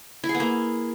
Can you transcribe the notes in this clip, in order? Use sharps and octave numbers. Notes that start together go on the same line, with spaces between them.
E4
G#4
B3
A#3